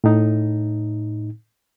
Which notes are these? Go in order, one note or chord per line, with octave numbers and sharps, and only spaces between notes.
A2 D#4